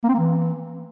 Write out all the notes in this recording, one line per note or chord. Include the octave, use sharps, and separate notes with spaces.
A#3
C4
A#3
E3